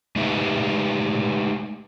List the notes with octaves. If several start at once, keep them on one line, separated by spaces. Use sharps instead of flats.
G#3 A3 D#4 G4 B4 E5